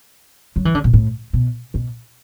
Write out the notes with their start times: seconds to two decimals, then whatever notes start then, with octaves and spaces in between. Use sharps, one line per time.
0.56 F#3
0.65 E3
0.75 D3
0.84 B2
0.93 A2
1.33 B2
1.74 B2